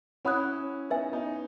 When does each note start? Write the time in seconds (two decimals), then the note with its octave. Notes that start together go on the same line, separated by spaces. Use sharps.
0.25 C#4 E4 C#5 F#5 B5 D#6 F#6
0.90 B3 D#4 B4 E5 G#5
1.12 B3 D#4